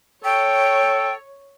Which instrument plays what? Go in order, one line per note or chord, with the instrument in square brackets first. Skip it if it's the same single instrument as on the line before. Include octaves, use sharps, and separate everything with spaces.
[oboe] A4 [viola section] C#5 [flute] G5